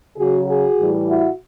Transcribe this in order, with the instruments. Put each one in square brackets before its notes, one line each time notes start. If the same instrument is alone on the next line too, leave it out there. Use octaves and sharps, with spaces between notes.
[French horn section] C#3 F#3 F#4 G#4
F#4 G#4
A2 E3 G3
E4 F#4